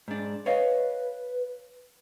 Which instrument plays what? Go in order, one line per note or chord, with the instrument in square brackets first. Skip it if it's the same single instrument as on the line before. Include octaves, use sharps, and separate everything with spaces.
[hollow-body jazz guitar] G#2 D4
[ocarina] B4 [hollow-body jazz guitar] C#5 D#5 F5